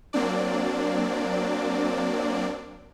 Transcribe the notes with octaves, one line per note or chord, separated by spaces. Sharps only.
F#3 A#3 C4 D4 D5